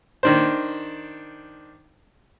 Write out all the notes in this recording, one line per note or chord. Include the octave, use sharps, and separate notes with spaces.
D#3 D4 C5